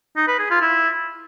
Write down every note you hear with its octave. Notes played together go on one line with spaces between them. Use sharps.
D#4
B4
G#4
F4
E4